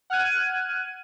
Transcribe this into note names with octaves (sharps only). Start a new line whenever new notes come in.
F#5 F6 F#6 G#6 D#7